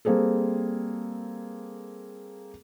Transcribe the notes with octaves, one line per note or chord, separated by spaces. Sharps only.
G3 A#3 C4 G#4 A4